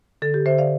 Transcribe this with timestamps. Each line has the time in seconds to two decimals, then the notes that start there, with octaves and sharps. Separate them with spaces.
0.22 D3 A4
0.34 G4
0.46 D3 C5 E5
0.58 D5 F5